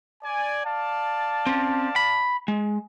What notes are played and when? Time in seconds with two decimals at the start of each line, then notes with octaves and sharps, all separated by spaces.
0.23 D5 G#5
0.64 D5 F5 A5
1.47 C4 C#4
1.96 B5
2.48 G#3